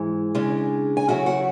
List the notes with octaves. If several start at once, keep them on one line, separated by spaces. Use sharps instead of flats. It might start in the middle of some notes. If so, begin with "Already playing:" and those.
Already playing: G#2 E3 G#3
C#3 G#3 D4
G#5
C#3 F#3 A3 E4 F#4 F#5
F#4 F#5